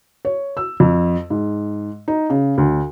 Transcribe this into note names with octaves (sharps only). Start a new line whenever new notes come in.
C#5
E6
F2
G#2
D#4
C#3
D2